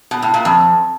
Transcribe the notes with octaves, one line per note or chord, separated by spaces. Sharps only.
B2
A2
A#2
F2